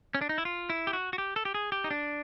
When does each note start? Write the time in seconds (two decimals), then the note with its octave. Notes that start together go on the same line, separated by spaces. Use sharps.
0.15 C#4
0.21 D4
0.29 D#4
0.38 E4
0.45 F4
0.70 E4
0.87 G4
0.93 F#4
1.13 F#4
1.18 G4
1.36 A4
1.45 G4
1.54 G#4
1.72 G4
1.84 D#4
1.91 D4